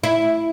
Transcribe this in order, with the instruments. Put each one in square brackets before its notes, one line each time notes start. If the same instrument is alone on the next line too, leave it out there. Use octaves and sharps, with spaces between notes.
[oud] E4